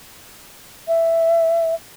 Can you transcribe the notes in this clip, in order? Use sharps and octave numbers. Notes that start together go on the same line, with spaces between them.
E5